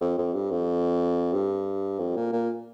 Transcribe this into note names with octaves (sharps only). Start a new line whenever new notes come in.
F2
F2
G2
F2
G2
F2
A#2
A#2